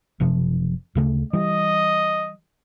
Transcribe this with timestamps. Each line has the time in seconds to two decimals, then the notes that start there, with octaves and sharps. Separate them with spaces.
0.20 F#1 C3 F3
0.95 D2 C#3 A3
1.33 E3 G3 D#5